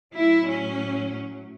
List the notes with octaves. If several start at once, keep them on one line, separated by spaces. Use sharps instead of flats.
A2 F#3 E4
C#4